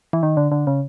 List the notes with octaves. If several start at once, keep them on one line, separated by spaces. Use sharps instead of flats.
E3
D#3
D3
D3
C#3